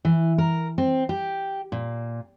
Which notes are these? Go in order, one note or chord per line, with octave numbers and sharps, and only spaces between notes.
E3
A#4
C4
G4
A#2